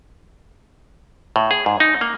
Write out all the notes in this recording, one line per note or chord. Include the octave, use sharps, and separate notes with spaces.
A2
G#4
G#2
D#4
A#3